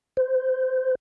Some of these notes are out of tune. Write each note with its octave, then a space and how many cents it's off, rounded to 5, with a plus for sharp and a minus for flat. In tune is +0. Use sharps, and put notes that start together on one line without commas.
C5 -20